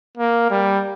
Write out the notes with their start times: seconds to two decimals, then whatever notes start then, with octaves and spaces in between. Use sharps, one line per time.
0.17 A#3
0.50 G3